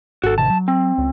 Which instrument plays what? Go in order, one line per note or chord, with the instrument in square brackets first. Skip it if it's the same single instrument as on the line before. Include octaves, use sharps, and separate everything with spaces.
[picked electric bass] G#1 [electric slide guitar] F#4 A4
[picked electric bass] A1 C3 D#3 [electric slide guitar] A5
[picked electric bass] F#3
[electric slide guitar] C4
[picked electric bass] C#2